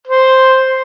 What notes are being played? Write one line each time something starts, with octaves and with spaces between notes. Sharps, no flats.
C5